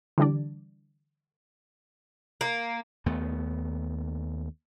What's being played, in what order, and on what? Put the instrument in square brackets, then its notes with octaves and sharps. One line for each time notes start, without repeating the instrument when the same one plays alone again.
[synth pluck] D3 E3 G3 D4 D5
[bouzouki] A#3
[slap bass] D#2 A3 B3